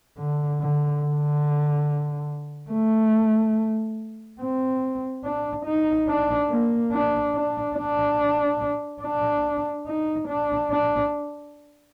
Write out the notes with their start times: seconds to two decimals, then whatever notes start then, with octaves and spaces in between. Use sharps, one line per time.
0.18 D3
0.61 D3
1.03 D3
2.71 A3
4.40 C4
5.24 D4
5.66 D#4
6.08 D4
6.50 A#3
6.92 D4
7.35 D4
7.77 D4
9.02 D4
9.87 D#4
10.28 D4
10.71 D4